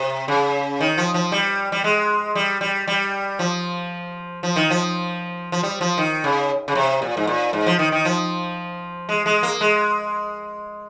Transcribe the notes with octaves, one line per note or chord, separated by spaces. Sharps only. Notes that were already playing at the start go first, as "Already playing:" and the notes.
Already playing: C3
C#3
D#3
F3
F3
G3
G3
G#3
G3
G3
G3
F3
F3
D#3
F3
F3
G3
F3
D#3
C#3
C#3
C3
A#2
G#2
A#2
G#2
F3
D#3
D#3
F3
G#3
G#3
A#3
G#3